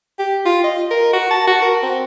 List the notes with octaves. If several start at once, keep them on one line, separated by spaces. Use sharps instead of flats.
G4
F4
D#5
A#4
F#4
A5
F#4
A#4
C4